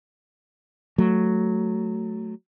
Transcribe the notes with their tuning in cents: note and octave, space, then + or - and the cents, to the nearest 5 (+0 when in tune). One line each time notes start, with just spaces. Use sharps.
F#3 +0 A3 +0